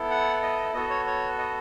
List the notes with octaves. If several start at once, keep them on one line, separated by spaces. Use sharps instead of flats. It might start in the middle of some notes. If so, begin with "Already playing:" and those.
Already playing: B3 E4 A4
F#5
D#5
B3 F#4 A4 D#5
C#5
C#5
D#5